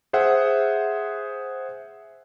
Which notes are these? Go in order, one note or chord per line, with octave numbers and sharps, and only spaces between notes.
G#4 C5 E5 F#5